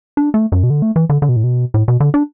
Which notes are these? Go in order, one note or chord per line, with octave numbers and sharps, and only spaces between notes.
D4
A3
F#2
B2
D3
A3
E3
D3
D3
B2
A2
B2
A2
B2
D3
D4